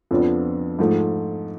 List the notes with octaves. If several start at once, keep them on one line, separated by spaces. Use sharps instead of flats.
F2 F3 B3 D4
G#2 F3 A3